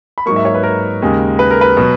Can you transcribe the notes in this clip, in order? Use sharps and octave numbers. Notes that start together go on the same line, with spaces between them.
B5
G#2 F#3 A#3 C#6
E5
C#5
B4
A#4
D#2 C#3 G#3
B4
A#4
B4
B2 F#3